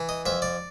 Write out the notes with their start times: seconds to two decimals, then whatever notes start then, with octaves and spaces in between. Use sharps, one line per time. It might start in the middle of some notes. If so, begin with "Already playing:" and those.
Already playing: E3
0.09 D#5
0.26 F2 E5
0.42 D5